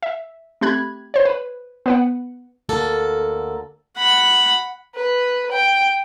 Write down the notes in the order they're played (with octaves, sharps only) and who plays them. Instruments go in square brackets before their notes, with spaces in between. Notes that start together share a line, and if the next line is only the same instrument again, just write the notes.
[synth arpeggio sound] E5
A3 C4 G4 B5 F#6 G#6
C5 C#5
B4
B3 B4 F#5
[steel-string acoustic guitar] D2 A#3 A4
[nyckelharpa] F#5 B5
[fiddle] B4
G5